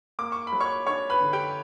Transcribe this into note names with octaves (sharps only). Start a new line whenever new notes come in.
A#3 D6
C#6
B5
F#3
C#5 C#6
D4 C#5 C#6
B4 B5
D3
G4 G5